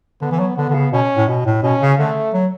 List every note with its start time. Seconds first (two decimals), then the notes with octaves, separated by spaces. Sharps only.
0.21 D3 B3
0.31 E3
0.40 F#3
0.57 D3 B3
0.69 D3
0.74 C#3
0.92 B2 C#4
1.17 A2
1.28 B2
1.45 A2
1.62 B2 C#4
1.81 C#3
1.99 D3 A3
2.33 F#3